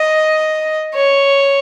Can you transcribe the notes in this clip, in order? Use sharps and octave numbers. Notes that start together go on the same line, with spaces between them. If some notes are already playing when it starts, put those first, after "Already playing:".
Already playing: D#5
C#5